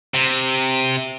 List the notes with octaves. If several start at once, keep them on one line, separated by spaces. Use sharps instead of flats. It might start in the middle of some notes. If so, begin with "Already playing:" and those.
C3